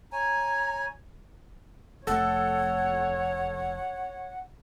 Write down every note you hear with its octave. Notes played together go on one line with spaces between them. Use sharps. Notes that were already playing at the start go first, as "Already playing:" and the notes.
C#5 G#5 A#5
F1 A3 A4 C#5 F#5